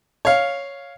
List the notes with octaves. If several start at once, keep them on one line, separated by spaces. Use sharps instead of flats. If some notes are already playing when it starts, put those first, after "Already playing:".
C#5 F5